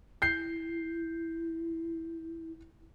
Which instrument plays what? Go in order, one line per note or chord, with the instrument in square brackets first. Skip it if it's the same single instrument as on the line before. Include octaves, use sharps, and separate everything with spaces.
[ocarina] E4 [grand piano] G6 C7